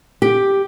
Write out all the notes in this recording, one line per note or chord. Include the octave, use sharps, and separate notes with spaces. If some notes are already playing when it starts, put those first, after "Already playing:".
G4